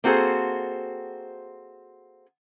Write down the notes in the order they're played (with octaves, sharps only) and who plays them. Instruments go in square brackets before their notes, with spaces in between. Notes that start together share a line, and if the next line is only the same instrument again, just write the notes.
[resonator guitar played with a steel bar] A#3 C4 F#4 G#4 A4 C5